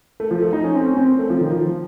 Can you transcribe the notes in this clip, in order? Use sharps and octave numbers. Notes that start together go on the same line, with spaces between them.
A3
F3
A3
D#4
C#4
C4
C#4
C4
C4
A3
F3
D#3
F3